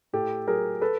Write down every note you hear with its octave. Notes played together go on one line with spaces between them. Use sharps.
A2 G4 A4
F#3 G#4 A#4
A4 B4